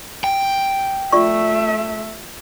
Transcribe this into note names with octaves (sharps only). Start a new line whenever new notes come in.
G5
A3 F4 D5 E5 C#6